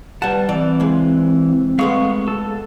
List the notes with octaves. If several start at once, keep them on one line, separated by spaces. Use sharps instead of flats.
G3 B4 F#5 A5
E3 C4 D5
C#2 G#3
G#3 A3 B3 F5 C#6
A4